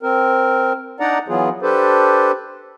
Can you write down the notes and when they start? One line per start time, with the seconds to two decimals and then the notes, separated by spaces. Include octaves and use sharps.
0.03 C4 A#4
1.00 D4 D#4 D5 F#5 A#5
1.28 E3 F#3 B3 F4 G#4
1.62 D4 G4 A4 B4 C5